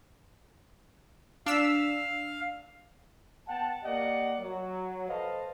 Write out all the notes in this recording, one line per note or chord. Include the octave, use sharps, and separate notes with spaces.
D4 F5 E6 B6
B3 F#5 G5 A5
A#3 G4 D5 D#5 F5 F#5
F#3
A4 B4 C5 D#5 F5 A5